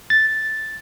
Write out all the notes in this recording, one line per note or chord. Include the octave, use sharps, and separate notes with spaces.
A6